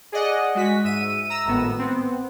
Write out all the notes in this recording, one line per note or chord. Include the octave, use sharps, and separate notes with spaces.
G#4 D5 D#5 F#5
G#3 F#4 B6
G#2 E5 D#7
A#5 E6
G#1 A2 B3
B3 C4